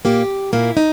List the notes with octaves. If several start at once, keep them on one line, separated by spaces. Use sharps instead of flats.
A#2 A#3 G4
A#2 A#3 E4
D#4